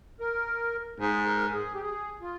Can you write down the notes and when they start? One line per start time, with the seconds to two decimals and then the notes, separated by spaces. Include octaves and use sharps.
0.20 A#4
1.00 G#2 G#4
1.27 A#4
1.54 G#4
1.74 G4
1.82 G#4
2.21 F4